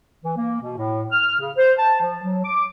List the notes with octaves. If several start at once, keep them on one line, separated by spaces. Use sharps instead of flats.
E3
A#3
B2
A2
F6
C#3
C5
A5
F3
F#3
D6